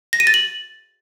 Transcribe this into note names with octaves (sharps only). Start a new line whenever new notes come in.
A#6
D#7
A6
F#7